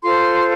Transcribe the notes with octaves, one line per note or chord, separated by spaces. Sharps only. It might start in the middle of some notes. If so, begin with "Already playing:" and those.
F4 A4 C5 C6